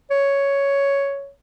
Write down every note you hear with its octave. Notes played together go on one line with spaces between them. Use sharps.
C#5